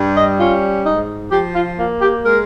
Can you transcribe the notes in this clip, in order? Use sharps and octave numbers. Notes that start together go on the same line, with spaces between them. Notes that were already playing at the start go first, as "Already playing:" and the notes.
Already playing: G2 G3
D#5
C#4 F4
G#2 D#4
F3 G4
F4
A#3 F4
G4
G#3 A#4